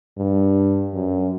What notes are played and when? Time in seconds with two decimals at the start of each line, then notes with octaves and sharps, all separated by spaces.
0.18 G2
0.94 F#2